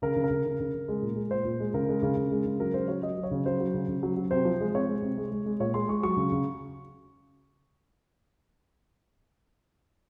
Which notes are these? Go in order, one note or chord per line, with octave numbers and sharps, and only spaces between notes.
C#3 A#4
C#3
A#4
C#3
C#3
C#3
C#3
G#3
A#2
G#3
A#2 C5
A#2
G#3
C#3 A#4
G#3
C#3
C#3
G#3
C#3
F#3 A#4
C#3 C5
F#3 C#5
F#3 D#5
F#3
C#5
C#3
F#3 C5
F#3
C#3
C#3
F#3
F#3
C3 C5
F3
G#3
C3 C#5
G#3
C3
G#3
G#3
G#3
A#2 C#5
G#3 C6
G#3 C#6
F#3 C#6
C#3
C#3